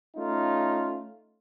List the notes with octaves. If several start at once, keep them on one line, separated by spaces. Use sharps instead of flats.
A3 C#4 D#4 F4